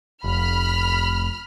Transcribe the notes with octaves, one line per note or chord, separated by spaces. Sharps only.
F1 B5 F6